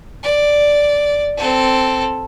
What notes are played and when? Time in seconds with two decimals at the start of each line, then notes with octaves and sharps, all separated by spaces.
0.23 D5
1.38 C4 A4